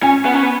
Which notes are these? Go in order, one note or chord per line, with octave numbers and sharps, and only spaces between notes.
C#4 G#5
B3
C#4
B3